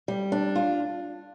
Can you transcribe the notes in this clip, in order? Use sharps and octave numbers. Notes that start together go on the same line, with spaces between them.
G3
D4
F4